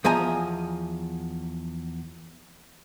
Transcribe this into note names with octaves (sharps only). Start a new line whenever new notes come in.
E2 F3 D#5 G#5 A#5